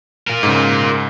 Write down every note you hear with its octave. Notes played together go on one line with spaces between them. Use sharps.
F4 A#4
G#2 C#3